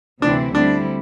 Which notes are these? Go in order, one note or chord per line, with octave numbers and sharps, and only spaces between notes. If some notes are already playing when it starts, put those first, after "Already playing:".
D2 C3 E3 C4 D4 E4
D3 G3 C4 D4 E4